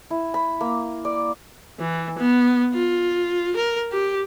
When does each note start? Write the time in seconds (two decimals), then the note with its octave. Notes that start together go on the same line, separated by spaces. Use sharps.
0.10 E4
0.34 B5
0.61 A#3
1.05 D5
1.80 E3
2.18 B3
2.74 F4
3.56 A#4
3.92 G4